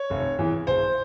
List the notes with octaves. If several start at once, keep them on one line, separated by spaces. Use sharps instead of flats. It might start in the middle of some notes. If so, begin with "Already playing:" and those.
Already playing: C#5
F1
E2 E3
E1 C5